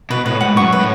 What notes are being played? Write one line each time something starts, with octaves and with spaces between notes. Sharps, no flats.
B2 B4
A2 B4
G#2 F#5
F#2 C#6
B4
A2